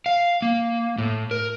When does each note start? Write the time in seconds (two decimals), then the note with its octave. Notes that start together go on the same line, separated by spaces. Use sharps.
0.06 F5
0.42 A#3
0.98 A2
1.31 A#4